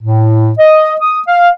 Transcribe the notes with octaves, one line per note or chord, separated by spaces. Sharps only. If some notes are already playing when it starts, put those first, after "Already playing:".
A2
D#5
D#6
F5